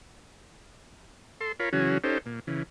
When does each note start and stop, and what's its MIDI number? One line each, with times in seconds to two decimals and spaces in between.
1.41 1.52 69
1.41 1.52 84
1.60 1.69 65
1.60 1.69 70
1.60 1.69 73
1.60 1.69 83
1.73 1.98 49
1.73 1.98 52
1.73 1.98 54
1.73 1.98 61
1.73 1.98 66
1.73 1.98 68
2.04 2.18 61
2.04 2.18 63
2.04 2.18 67
2.04 2.18 69
2.04 2.18 72
2.26 2.40 46
2.47 2.63 49
2.47 2.63 52